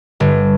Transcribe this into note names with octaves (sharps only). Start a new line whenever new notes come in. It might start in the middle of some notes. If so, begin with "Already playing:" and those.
G1